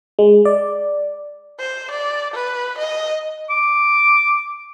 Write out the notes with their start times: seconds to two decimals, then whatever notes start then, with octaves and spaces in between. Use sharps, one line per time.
0.19 G#3
0.45 D5
1.60 C5
1.91 D5
2.34 B4
2.78 D#5
3.50 D6